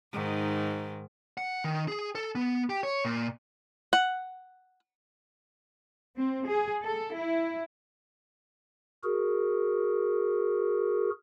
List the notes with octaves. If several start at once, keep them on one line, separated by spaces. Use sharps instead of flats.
G#2 D#3
F#5
D#3
G#4
A4
B3
G4
C#5
A#2
F#5
C4
G#4
A4
E4
F#4 G#4 A#4